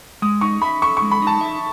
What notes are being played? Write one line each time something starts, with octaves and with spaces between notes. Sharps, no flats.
G#3 D#6
D#4 C#6
E5 B5
A4 C#6
C#6
G#3
B5
D#4 A5
E5